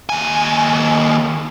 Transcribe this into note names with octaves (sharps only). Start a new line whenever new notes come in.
D#2 G#5